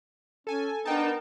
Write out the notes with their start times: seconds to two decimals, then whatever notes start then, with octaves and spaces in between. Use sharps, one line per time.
0.47 C#4 A4 G#5
0.85 B3 D4 D#4 A#4 G5 A5